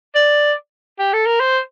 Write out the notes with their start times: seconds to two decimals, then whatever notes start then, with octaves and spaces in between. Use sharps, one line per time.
0.15 D5
0.99 G4
1.13 A4
1.26 A#4
1.40 C5